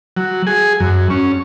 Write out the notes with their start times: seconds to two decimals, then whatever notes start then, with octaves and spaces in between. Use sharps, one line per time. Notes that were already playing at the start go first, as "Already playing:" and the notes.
0.17 F#3
0.47 G#4
0.80 F#2
1.10 C#4